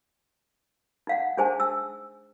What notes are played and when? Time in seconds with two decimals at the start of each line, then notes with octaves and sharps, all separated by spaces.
1.07 D#4 F5 F#5
1.37 D4 D#4 G#4 C5 G#5 A5
1.60 E6